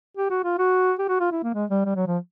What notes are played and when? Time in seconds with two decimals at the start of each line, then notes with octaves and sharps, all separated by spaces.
0.17 G4
0.30 F#4
0.44 F4
0.58 F#4
0.99 G4
1.09 F#4
1.20 F4
1.32 E4
1.43 A#3
1.55 G#3
1.70 G3
1.85 G3
1.96 F#3
2.07 F3